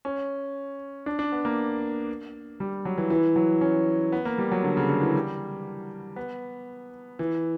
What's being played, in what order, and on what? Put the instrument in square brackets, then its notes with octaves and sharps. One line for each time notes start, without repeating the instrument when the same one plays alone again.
[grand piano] C#4
D4
D4
B3
A#3
G3
F#3
E3
E3
F#3
C#4
B3
A#3
G3
F#3
D3
C#3
D3
E3
G3
B3
E3